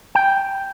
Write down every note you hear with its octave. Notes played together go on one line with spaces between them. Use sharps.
G5